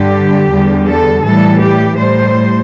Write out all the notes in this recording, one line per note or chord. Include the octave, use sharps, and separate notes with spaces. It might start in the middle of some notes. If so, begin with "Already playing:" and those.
Already playing: G2 D3 G3 G4
E2 D3 G3
A4
A2 E3 G3 A4
G4
A2 G3 C5